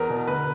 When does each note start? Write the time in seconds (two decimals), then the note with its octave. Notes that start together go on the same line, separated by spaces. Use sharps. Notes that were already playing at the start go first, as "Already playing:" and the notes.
Already playing: E2 A#4
0.10 B2
0.27 D2 B4